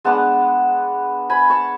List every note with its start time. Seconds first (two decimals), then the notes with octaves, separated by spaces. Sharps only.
0.05 G#3 B3 D4 F#5 A5
1.30 G#5 B5
1.50 A5 C#6